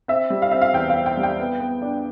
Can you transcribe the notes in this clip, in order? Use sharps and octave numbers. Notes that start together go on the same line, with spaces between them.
C4 E5
G3
F5
C4 E5
F5
E2 G5
F5
C4
G5
G3
G5
B3
B3
D4